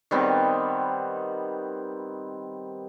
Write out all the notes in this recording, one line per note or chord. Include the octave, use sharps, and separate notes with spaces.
D#3 G3 B3 C4